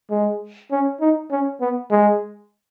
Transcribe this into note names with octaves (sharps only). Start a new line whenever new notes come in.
G#3
C#4
D#4
C#4
B3
G#3